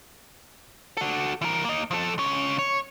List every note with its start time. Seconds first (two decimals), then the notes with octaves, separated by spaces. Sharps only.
0.97 F#4 A4
1.41 E3 A#4
1.65 A#3 D#5
1.91 F3 A4
2.18 C#2 C#4
2.59 C#5